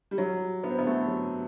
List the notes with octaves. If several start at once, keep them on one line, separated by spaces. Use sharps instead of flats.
G3
F#3
B3
C4
B3
A3
F#3